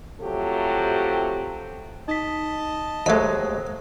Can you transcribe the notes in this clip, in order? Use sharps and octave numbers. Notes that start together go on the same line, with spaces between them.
C3 F3 F#3 A3 G4 A4
D#4 D#5 A5 B6
D#2 F#3 G#3 A3 D#4 C5